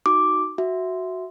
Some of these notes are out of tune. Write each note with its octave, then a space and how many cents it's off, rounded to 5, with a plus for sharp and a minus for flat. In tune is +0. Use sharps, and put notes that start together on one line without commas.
D#4 -5 F#4 +10 D6 +0
F#4 +0 E5 +0